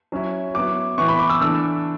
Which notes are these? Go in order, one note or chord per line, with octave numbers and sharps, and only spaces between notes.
F#3 C#4 E4
F#3 B3 E4 D6
A2 E3 B3 E4 C#6
B5
D6
E6
E3 A3 D4 E6